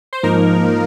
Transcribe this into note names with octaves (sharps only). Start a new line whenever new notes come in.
C5
G#2 F3 A#3 D#4 A#4